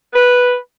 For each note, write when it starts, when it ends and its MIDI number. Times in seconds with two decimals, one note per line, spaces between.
0.13 0.55 71